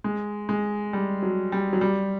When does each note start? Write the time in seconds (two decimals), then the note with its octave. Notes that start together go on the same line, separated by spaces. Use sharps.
0.04 G#3
0.49 G#3
0.93 G3
1.23 F#3
1.52 G3
1.73 F#3
1.81 G3